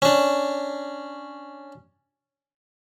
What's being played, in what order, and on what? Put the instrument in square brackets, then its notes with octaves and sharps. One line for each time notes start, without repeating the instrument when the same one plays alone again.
[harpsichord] C#4 D4